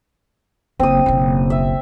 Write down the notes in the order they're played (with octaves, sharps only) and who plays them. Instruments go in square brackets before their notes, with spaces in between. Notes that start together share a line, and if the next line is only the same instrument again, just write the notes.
[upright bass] F#1 [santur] C4 D#6
[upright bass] F#1 B1
[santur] E5